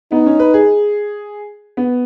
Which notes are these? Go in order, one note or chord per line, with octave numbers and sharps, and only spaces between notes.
B3 D#4
C#4
B4
G#4
B3